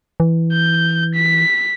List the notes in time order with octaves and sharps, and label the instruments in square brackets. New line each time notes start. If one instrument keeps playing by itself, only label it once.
[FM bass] E3
[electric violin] G6
B6